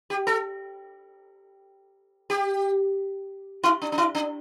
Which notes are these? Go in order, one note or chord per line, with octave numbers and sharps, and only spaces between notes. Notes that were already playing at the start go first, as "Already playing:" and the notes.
G4
A4
G4
E4
D4
D4
E4
D4